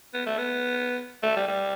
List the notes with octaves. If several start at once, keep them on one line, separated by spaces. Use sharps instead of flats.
B3
A3
B3
A3
G3
G3